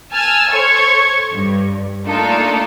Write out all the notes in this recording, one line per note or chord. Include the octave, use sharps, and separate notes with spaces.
G#5 A5 E6 F6 G#6
A4 C5 C#5 C#6 G#6
G2
A3 A#3 D4 D#4 F4 A4